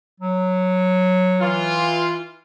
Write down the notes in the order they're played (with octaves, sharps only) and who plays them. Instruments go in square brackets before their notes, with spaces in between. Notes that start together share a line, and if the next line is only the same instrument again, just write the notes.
[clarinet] F#3
[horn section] E3 F4